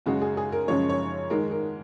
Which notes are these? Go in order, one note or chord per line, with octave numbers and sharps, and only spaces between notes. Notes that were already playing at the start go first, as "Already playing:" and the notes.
F#2 C#3 G#3 F#4
G#4
G#4
A#4
F#2 C#3 F3 G#3 C#5
C#5
G#2 D#3 G#3 A#4
A#4